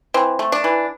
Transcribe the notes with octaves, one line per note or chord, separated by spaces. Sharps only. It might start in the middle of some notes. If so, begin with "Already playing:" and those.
E3 C4
A3
D4
E3